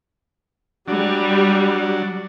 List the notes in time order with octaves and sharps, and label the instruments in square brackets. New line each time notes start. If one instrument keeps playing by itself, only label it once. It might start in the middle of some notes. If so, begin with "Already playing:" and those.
[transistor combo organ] F#3 D4 [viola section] G3